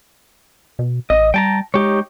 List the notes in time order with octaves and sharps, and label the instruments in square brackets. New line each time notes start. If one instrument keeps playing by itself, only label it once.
[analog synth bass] B2
[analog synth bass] A1 [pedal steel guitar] D#5
[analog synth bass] G3 [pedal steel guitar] G5 A5 A#5
[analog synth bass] G#3 [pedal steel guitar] D#4 G4 C#5